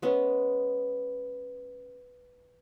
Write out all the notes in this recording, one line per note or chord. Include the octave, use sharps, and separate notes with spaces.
G#3 B3 C#4